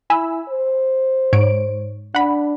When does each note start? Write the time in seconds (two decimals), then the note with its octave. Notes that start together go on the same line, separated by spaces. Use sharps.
0.10 E4 G#5 B5 E6
0.49 C5
1.33 G#2 C#5 D7
2.15 D4 F#5 B5